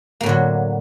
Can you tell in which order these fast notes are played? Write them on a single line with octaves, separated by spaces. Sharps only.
A#3 A2 D3 F#3